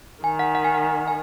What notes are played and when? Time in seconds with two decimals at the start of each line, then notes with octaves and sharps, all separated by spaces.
0.23 D#3 G#5
0.39 F#5
0.55 F#5
0.64 G#5
0.74 F#5
1.08 G#5